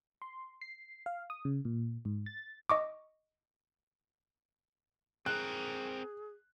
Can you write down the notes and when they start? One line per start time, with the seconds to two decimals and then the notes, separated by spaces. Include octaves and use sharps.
0.22 C6
0.61 C7
1.06 F5
1.30 D#6
1.45 C#3
1.65 A#2
2.05 G#2
2.26 A6
2.69 D#5 C#6 D6
5.26 C4 G#4 A#4 F#6